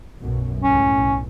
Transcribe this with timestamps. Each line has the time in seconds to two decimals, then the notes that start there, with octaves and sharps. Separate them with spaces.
0.20 B1 F#2 B2
0.64 C#2 A2 C#4
0.98 B1